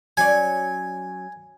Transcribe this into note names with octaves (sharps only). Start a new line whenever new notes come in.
F#3 C#4 D5 G#5